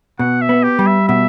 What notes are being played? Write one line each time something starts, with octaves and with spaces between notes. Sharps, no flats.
B2 F#5
E5
B3
G4
G3
E5
B2 E5